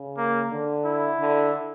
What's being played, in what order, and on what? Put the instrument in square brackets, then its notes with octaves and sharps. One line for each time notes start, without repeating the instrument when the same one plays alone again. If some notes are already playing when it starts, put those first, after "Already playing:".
Already playing: [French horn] C#3
[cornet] A#3
[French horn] D3
[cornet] E4
[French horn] D3